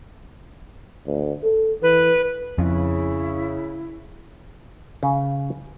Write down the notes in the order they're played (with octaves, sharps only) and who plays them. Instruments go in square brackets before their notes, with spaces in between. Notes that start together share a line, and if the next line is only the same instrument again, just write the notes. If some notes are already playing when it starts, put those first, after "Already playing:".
[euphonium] D2
A4
[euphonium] E3 [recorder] B4
[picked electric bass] F2 [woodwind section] C#3 [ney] E4
[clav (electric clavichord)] C#3